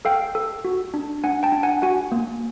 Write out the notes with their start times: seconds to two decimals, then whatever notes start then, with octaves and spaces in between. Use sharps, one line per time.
0.05 A4 F5 G5
0.35 A4
0.65 F#4
0.94 D4
1.24 D4 F#5 G#5
1.43 G5 A5
1.52 D4
1.63 F#5 G#5
1.82 F#4 F#5 G#5
2.12 A#3